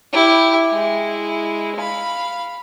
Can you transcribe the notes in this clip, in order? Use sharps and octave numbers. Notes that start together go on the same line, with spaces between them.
E4 G4
G#3 E4
F5 B5